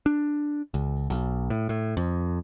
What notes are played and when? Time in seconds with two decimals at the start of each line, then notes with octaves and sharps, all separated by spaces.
0.06 D4
0.74 C#2
1.10 B1
1.50 A2
1.69 A2
1.97 F2